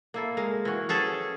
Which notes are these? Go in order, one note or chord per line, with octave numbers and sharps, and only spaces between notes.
A#3 E4 A4
G#3 A#4
E3 F#4
C#4 G#4 A4